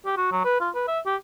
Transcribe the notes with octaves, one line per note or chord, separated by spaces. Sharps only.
G4
F#4
F#3
B4
F4
B4
E5
G4